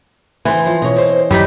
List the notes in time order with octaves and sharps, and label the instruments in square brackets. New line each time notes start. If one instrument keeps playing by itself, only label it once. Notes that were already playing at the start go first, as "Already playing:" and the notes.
[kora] E3 [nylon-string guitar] B3 C5
[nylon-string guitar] F3
[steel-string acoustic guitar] B2 [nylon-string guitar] C#5 D#5
[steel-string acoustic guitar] C4 C5
[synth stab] F#2 B5 B6 [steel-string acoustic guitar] D#3 E3 C#4 [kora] G3 D#4